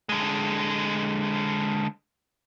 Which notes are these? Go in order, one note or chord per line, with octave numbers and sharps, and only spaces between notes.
D3 G#3